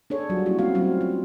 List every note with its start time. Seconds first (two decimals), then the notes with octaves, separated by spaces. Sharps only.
0.10 D4 G#4 A4 C#5
0.29 F#3 G3 F4 F#4
0.46 A#3 C#4 E4 F#4
0.59 A3 C4 C#4 F#4 F5
0.75 F#3 G3 C4 F4 F#4
1.01 F4